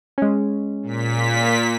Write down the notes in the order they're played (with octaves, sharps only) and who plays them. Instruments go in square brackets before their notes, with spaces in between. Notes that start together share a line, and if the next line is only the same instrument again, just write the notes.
[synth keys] G#3 C#4
[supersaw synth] A#2 B6